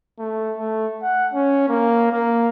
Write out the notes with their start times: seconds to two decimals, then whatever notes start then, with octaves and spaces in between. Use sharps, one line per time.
0.19 A3
0.58 A3
1.02 F#5
1.33 C#4
1.69 A#3
2.12 A#3